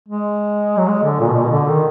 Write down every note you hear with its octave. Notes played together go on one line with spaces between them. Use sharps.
G#3
F#3
G#3
D3
A#2
B2
A#2
B2
D3
D#3